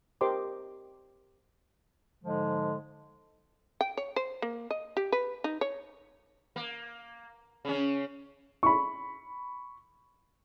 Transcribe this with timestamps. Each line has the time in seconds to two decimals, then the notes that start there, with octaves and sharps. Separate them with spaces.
0.21 G4 A#4 C5 D#5 C6 D6
2.24 G#2 D3 F3 G#3
3.81 G5
3.97 C#5
4.16 C5
4.42 A#3
4.71 D#5
4.97 G4
5.12 B4
5.44 D#4
5.61 C#5
6.56 A#3
7.65 C#3 C#4
8.63 B5 C#6